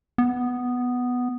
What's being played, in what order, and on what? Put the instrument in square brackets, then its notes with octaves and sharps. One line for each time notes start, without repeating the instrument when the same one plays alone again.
[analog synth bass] B3